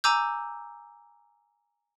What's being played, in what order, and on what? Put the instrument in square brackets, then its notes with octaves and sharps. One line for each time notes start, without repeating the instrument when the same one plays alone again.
[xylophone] G#5 A#5 D6 E6 G6